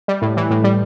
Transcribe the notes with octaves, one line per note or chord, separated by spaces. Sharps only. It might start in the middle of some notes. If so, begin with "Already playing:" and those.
G3
A2
E3
A2
G3